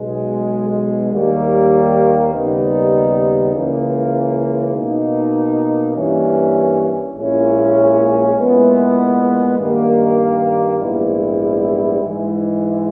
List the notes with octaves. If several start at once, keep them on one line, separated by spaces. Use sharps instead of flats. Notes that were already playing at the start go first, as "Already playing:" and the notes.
Already playing: B1 B2 G#3
D#2 D#3 G3 A#3
D#2 C#3 G3 B3 D#4
C#2 C#3 E3 A#3
B2 A#3 D#4
G2 E3 A#3 C#4
A#1 A#2 G#3 C#4 E4
A#2 G#3 B3 E4
G2 D#3 A#3
A#1 G#2 G3 B3 E4
G#2 E3 G#3